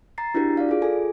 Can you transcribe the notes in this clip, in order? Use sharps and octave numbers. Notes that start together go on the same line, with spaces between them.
A#5 A6 C7
D4 E4 F#4 G4 A#4
D5 F5
F4 G#4
A4 G#5